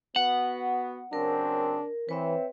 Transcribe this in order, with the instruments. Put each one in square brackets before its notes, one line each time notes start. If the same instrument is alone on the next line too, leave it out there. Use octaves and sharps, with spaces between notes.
[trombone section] B3 F#4 [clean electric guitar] F#5
[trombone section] C#3 F#3 C4 [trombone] D4 [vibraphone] A#4
[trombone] E3 [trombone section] C4 [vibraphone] B4 C#5 E5